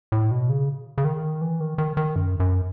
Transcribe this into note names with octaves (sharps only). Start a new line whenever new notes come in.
A2
B2
C#3
C#3
D#3
E3
D#3
D#3
D#3
F#2
F#2